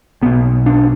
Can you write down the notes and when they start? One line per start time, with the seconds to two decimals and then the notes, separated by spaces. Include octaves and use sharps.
0.22 B1 B2 B3
0.66 D4